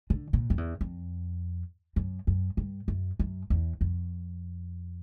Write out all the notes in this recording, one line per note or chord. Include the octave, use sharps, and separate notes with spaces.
D3
A#2
F2
E2
F2
F#2
F#2
G2
F#2
F#2
E2
F2